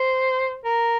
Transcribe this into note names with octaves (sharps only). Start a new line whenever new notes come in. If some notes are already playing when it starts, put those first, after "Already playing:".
Already playing: C5
A#4